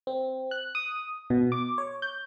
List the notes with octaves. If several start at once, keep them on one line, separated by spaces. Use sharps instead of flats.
C4
F#6
D#6
B2
D6
C#5
G6